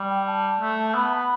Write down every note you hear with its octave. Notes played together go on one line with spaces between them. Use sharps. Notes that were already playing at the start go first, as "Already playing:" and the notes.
Already playing: G3
G5
A5
A3
B3 B5
A5
B5